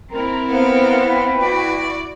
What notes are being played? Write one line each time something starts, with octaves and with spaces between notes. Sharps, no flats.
C4 E4 A#4 A#5
B3 A#4 C5 F5
B4 G5
E4 F#4 D5